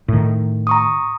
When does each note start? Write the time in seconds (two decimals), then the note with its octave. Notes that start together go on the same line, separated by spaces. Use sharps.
0.08 A2 D#3
0.67 A#5 C#6 D#6